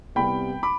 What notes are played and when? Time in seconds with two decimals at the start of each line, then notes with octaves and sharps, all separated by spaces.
0.15 C2 C3 G3 B3 G5 B5
0.63 B5 D6